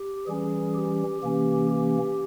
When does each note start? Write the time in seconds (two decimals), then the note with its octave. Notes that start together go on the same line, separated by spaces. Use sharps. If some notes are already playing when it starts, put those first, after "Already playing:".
Already playing: G4
0.27 E3 G3 C#4 G#4
0.74 G4
1.22 C3 E3 A#3 C#4 G4
1.70 G4